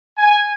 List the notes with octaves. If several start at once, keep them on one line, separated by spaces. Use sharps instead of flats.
G#5